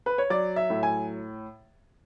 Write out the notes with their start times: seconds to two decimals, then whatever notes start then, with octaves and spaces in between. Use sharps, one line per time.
0.06 B4
0.18 C#5
0.30 F#3 D5
0.56 E5
0.70 A2
0.83 G#5